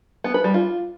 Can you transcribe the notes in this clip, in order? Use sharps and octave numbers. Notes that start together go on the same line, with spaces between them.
B3
B4
G3
F4